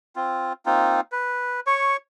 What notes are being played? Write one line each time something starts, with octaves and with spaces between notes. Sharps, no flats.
C4 F4
A#3 C4 D#4 F4
B4
C#5 C#6